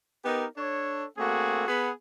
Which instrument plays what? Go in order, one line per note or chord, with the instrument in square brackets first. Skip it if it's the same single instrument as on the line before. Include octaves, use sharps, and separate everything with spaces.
[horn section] B3 D#4 G4 A#4
D4 A4 C#5
A3 A#3 C4 F#4 G#4
B3 G#4 F#5 B5